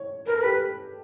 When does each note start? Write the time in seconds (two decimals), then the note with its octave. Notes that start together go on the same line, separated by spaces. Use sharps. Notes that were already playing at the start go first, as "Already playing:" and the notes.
Already playing: C#5
0.26 A#4 B4
0.35 A4
0.41 G4 B4